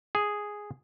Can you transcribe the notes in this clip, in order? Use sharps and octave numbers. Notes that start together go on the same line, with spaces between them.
G#4